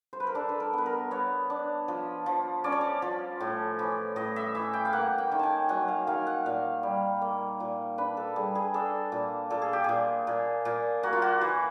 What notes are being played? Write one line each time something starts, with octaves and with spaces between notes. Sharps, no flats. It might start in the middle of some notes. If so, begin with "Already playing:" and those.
C5
B4
A#4
D4 A4
B4
A#4
B3 B4
A#4
B3 C#5
D4
F3
F3
C#4 D5
C#5
D5
F3
A2
E3
A2 D#5
E5
E3
G5
F5
A#3 F#5
G5
D#3
G#5 A5
F#3 F#5
F5
D#3 F5
F#5
A#2 F5
G3
A#3
A#2
D4 B4
A4
G3 G#4
G#4
D4 A4
A#2
A#2 A4
G#4
G4
A#2 G#4
A#2
A#2
A#3 F#4
F4
F#4
E3